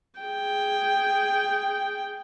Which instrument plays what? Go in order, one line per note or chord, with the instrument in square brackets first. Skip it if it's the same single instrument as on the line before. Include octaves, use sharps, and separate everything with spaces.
[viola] G#4 G5